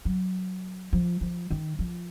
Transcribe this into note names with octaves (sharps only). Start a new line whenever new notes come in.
F#3
F3
F3
D#3
F3